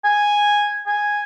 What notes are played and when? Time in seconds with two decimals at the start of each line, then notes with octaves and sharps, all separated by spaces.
0.04 G#5
0.87 G#5